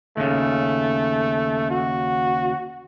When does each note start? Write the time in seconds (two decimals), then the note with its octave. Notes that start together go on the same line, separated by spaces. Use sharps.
0.17 D#2 C#3 A3
1.71 F#4